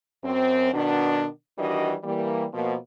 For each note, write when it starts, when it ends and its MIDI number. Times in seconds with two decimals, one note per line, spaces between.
0.23 0.72 42
0.23 0.72 60
0.73 1.26 47
0.73 1.26 51
0.73 1.26 62
1.57 1.94 51
1.57 1.94 52
1.57 1.94 55
1.57 1.94 62
1.57 1.94 66
1.57 1.94 75
2.04 2.44 52
2.04 2.44 55
2.04 2.44 58
2.53 2.76 47
2.53 2.76 53
2.53 2.76 58